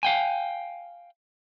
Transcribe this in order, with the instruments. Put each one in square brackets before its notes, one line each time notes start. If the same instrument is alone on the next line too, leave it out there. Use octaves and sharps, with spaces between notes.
[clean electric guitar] F5 G5 G#5